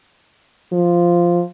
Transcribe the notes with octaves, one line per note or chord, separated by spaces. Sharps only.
F3